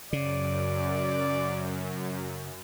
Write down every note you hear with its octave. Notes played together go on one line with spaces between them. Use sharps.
F#2 C#3 D5